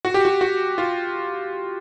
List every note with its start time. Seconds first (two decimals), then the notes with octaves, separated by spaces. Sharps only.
0.05 F#4
0.14 G4
0.25 F#4
0.41 F#4
0.78 F4